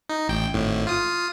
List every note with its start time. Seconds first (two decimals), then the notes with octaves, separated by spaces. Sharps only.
0.10 D#4
0.28 A1 G5
0.54 G#1 A2
0.87 F4 D#6